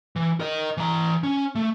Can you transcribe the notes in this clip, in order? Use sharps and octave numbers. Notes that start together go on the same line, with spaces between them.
E3
A#4 D#5
E3 A#5
C#4
A3